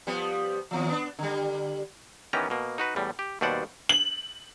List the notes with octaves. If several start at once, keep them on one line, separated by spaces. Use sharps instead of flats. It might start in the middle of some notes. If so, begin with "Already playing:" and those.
F3 G3 B3
D#2 F3
B3 C#4 D4
D3 G3
D#3 E3 B3 C#4 G4 A#5
B2 A#3
D#4 F#4 B4
E2 A2 G3
G4
D#2 B2 G3 C5 D5 F#5
F#7